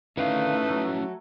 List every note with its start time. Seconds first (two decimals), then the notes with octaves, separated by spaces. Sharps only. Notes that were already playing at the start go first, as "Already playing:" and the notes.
0.17 D3 D#3 A3 C#4 D#4 E4 B4 F5
0.70 F#3